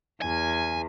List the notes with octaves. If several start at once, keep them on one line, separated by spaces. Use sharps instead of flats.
E2 G#5